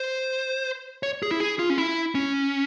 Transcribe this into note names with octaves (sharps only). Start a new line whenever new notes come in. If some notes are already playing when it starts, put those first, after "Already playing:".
Already playing: C5
C#5
G#4
E4
G#4
F4
C#4
E4
C#4